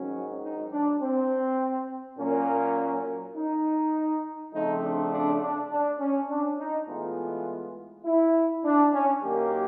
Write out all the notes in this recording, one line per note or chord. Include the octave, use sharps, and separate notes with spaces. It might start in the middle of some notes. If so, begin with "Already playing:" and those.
Already playing: G#2 D#3 F#3 C#4
D#4
D4
C4
A#2 F#3 A#3 C#4
D#4
C#3 F3 A3 C4 D#4
D4
D4
D4
D4
C#4
D4
D#4
A2 E3 G#3 B3 F4
E4
D4
C#4
F#2 D#3 F#3 A#3 G4